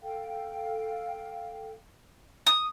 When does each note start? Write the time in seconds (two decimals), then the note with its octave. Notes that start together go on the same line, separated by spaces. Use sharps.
0.02 A4 F5 G5
2.47 D#6